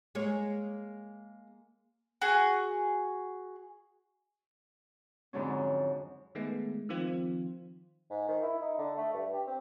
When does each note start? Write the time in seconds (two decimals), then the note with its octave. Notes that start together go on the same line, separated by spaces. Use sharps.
0.15 G#3 A#3 C#5
2.22 F#4 G#4
5.33 F2 G#2 D3 F#3 C#4
6.35 D#3 G#3 A3 B3
6.89 D#3 F3 C4 F4
8.10 G#2
8.29 D#3
8.42 E4
8.62 D#4
8.78 D3
8.97 A3
9.14 G2
9.34 G4
9.47 C4